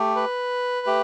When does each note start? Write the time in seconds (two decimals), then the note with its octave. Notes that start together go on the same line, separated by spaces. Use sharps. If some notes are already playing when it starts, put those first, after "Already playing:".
Already playing: A3 G4
0.16 B4
0.87 A3 G4